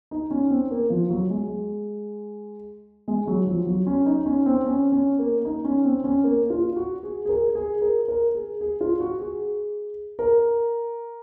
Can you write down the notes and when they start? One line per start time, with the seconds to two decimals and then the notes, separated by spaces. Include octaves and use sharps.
0.11 D#4
0.31 C#4
0.50 C4
0.71 A#3
0.90 F3
1.10 F#3
1.30 G#3
3.08 G#3
3.27 F#3
3.47 F3
3.67 F#3
3.87 C#4
4.06 D#4
4.26 C#4
4.46 C4
4.66 C#4
4.92 C#4
5.19 A#3
5.45 D#4
5.64 C#4
5.85 C4
6.04 C#4
6.24 A#3
6.50 F4
6.76 F#4
7.03 G#4
7.25 G#4
7.29 A#4
7.55 G#4
7.82 A#4
8.08 A#4
8.35 G#4
8.61 G#4
8.81 F4
9.00 F#4
9.20 G#4
10.19 A#4